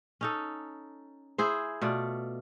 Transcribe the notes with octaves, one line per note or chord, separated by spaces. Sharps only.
C#4 D#4 A4
E4 G#4 C5
B2 A3 F4 D5